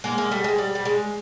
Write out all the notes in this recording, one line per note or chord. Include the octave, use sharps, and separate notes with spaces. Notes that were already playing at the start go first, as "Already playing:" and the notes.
G#3 A#3
G#3 A#3
G3 A3
G#3
G3
G3
G#3